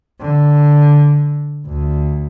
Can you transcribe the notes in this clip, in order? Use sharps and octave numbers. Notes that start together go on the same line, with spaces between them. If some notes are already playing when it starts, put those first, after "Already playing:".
D3
D2